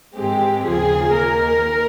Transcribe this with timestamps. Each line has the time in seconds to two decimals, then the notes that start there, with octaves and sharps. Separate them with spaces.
0.16 G#2 D#3 G#3 C4 G4
0.65 D#2 C#3 F3 G#4
1.13 D#2 D#3 A#3 A#4